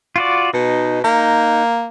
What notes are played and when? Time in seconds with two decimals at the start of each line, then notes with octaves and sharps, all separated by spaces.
0.16 F4 F#4 D5
0.54 B2 D#4
1.04 A#3 D#4